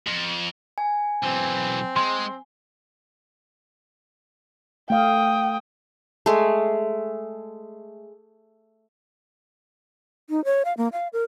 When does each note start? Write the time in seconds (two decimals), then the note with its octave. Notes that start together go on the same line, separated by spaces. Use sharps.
0.07 F2
0.78 G#5
1.24 B1 E3 C4
1.96 G#3 C6
4.90 A3 F5 G5 D#6
6.26 G#3 A3
10.30 D#4
10.45 C#5
10.65 F5
10.77 A#3
10.92 F5
11.13 A#4